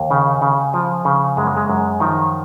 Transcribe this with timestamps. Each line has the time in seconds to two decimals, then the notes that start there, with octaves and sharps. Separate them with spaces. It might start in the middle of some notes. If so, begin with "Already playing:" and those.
Already playing: D#2
0.11 C#3
0.42 C#3
0.74 F3
1.05 C#3
1.37 F#2 G#3
1.47 A#3
1.57 G#3
1.69 F#2
2.00 D#3 F3 D#4